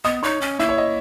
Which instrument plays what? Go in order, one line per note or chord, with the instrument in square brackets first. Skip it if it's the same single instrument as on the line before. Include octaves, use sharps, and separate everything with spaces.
[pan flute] B3 [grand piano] D#5 D#6
[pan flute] D#4 [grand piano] C#5 C#6
[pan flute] C#4
[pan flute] A#3 [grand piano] E4 E5
[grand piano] C#5
D#5